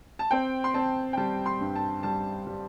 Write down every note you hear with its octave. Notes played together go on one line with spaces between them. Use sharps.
A5
C4 G5
C6
C4 A5
G5
G3 A5
C6
G2
A5
G3 A5
G3